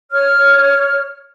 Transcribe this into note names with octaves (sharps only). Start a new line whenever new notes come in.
C#5 F6